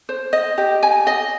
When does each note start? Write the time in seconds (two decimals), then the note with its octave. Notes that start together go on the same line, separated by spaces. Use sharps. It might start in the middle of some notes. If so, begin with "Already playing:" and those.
0.09 C5
0.33 D#5
0.58 G4
0.83 G#5
1.07 D#5